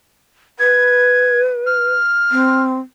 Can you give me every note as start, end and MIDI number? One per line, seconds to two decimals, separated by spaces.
0.59 1.94 71
0.59 1.40 92
1.66 2.63 89
2.31 2.78 60